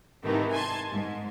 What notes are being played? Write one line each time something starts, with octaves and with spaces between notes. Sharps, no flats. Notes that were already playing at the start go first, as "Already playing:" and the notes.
G#2 C3 D#3 E3 A3 D#4
G#5 A5 C6 G#6
G#2